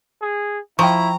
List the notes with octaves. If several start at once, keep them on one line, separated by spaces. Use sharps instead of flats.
G#4
F3 E4 G5 A#5 C#6